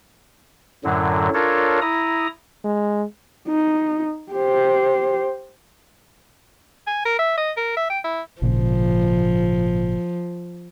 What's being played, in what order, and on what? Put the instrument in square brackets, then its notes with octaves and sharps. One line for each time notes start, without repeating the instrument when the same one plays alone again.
[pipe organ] F#2 A2 D3 F#3
D4 F4 A4 A#4 C#5
E4 A#5 D#6
[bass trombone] G#3
[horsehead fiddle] D#4
G4 C5
[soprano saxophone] G#5
A#4
E5
D#5
A#4
E5
G5
E4
[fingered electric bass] G#1 A#2 C#3 [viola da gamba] F3